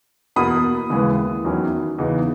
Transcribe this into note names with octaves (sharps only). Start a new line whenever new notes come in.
E2 B2 A#3 B5 D#6
D#2 C#3 E3 G#3 B3
E2 D#3 F#3 C#4 E4
E2 C#3 E3 B3 D#4